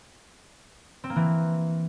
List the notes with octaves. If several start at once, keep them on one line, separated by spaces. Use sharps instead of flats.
C4
A#3
E3